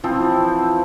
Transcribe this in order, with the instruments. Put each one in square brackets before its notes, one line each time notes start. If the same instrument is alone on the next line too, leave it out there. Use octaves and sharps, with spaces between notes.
[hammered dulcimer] E3 F3 C4